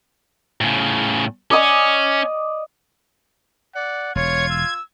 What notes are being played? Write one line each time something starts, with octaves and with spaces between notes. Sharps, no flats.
A2 C#3
C#4 D5 D#5 D#6
D5 F#5
E1 F4 C#5 G#6
E6